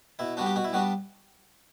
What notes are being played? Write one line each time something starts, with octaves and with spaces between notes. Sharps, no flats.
B2 E4
G3 B3 D4 F#4
G4
B2 F#4
E4
G3 B3 D4 F#4